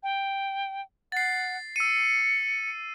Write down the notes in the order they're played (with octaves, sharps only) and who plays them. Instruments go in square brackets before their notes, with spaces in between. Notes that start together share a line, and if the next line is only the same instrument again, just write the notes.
[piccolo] G5
[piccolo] F#5 [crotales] A6 C7
[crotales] E6 D#7 [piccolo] C#7